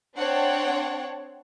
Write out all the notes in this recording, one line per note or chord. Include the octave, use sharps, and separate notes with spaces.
C4 D4 C#5 F#5 G5 A5